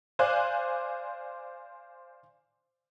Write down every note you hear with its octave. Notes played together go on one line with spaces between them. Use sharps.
C5 D5 F5 G#5 F#6